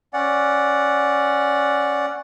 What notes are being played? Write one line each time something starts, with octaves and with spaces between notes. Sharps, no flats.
C#4 D5 F#5